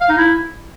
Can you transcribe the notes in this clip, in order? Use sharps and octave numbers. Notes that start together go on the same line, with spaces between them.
F5
D#4
E4